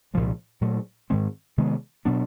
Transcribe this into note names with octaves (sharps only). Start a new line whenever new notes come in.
C2 A#2 F3 G#3
A#2 F#3 A3
G#2 D#3 G#3 C4
C3 D#3 G#3 B3
B2 F#3 B3 D4